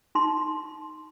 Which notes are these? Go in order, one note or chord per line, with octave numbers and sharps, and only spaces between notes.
D#4 C6